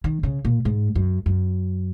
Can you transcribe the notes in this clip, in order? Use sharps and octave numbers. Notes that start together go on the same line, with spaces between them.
D#3
C#3
A#2
G#2
F#2
F#2